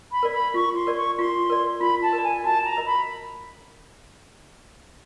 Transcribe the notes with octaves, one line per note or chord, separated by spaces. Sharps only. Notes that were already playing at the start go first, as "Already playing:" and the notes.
B5
A#4 D5
B5
F4 C#6
C6
A#4 D5
C#6
F4 C6
A#4 D5
F4 B5
A5
A#4
D5
G#5
F#4 A5
A#5
A#4 D#5
B5